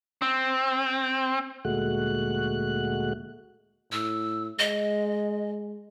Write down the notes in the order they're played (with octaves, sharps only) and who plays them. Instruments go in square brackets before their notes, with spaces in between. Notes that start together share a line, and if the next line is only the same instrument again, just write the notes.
[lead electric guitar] C4
[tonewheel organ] D2 A#2 G#3 A3 F#4 F#6
[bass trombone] A2 [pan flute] E6
[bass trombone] G#3 [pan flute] D#5